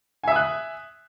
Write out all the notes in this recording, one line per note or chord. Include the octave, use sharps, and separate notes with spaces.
E5 G#5 D#6 F#6